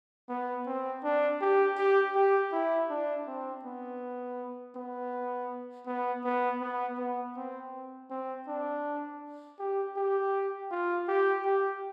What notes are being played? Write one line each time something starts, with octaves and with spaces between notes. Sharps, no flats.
B3
C4
D4
G4
G4
G4
E4
D4
C4
B3
B3
B3
B3
B3
B3
C4
C4
D4
G4
G4
F4
G4
G4